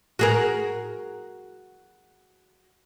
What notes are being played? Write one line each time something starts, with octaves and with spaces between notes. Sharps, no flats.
F#4 G#4 A#4